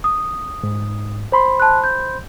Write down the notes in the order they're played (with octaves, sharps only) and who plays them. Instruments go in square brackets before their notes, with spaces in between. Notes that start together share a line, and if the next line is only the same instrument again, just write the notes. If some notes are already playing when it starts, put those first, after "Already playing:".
[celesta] D#6
[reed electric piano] G#2
C5 B5 C6
[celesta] A5 F#6
G6